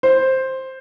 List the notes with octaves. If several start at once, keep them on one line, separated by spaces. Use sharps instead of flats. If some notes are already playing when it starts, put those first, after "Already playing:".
C5